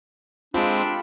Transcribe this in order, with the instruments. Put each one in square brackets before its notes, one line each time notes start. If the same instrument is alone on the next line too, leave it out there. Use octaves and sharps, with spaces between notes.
[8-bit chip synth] G#3 C4 [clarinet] D4 [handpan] F4 [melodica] G4 A4 B5